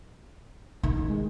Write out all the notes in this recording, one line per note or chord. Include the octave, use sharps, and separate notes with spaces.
A1 D#3
G#3